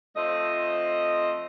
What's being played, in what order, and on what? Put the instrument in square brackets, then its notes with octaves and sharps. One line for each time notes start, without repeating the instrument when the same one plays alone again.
[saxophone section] F3 A3 C4 D#5